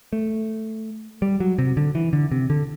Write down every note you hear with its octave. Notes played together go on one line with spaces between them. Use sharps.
A3
G3
F#3
C3
D3
E3
D3
C3
D3